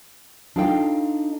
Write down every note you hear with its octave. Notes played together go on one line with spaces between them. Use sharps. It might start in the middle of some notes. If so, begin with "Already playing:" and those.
D4 D#4 F4 A4 F5 G5